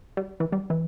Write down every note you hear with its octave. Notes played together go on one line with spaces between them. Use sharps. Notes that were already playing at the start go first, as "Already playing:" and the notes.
G3
E3
G3
E3